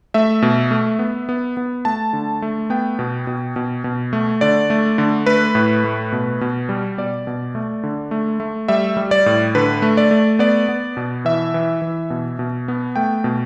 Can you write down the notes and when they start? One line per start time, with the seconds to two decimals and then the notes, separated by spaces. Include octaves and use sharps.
0.14 A3 E5
0.42 B2
0.71 A3
0.99 B3
1.29 B3
1.57 B3
1.85 A3 A5
2.13 D3
2.42 A3
2.70 B3 G5
2.99 B2
3.27 B2
3.56 B2
3.84 B2
4.13 A3
4.41 D3 D5
4.70 A3
4.98 D3
5.26 A3 B4
5.55 A2
5.84 A3
6.12 B2
6.41 B2
6.69 G3
6.98 B2 D5
7.27 B2
7.55 A3
7.83 D3
8.11 A3
8.40 A3
8.68 G3 E5
8.97 G3
9.11 D5
9.26 A2
9.55 D3 B4
9.82 A3
9.97 D5
10.11 A3
10.39 B3 D5
10.69 B3
10.97 B2
11.25 E3 E5
11.54 E3
11.82 E3
12.10 B2
12.39 B2
12.68 B3
12.96 A3 G5
13.24 B2